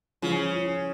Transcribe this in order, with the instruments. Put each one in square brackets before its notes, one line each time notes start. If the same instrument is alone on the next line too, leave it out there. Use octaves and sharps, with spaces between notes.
[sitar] C#3 [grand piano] F3
[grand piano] F4